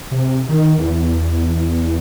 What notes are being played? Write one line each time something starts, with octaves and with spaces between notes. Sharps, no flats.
C3
D#3
E2